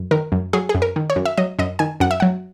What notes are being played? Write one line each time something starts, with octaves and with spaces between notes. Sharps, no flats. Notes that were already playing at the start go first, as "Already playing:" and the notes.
Already playing: F#2
D#3 A#4
F#2
F#3 G#4
G#4
F#2
A#4
D#3
C#5
F#2
E5
F#3 D#5
F#2 D#5
D#3 G#5
F#2 F#5
E5
F#3 F#5